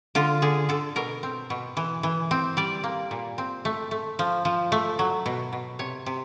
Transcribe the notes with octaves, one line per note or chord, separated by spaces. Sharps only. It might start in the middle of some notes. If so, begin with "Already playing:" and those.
D3 F4
D3 G#4
D3 A4
B2 A#4
C4
B2
E3
E3
C4
G3 D5
A#3
A#2
C4
A3
A3
F3
F3
A3
F#3
B2
B2
C3 C#5
C3